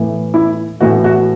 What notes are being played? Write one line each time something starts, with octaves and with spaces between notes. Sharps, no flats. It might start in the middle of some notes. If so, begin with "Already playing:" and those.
Already playing: A2 E3
E4
A2 E3 F#4
F#4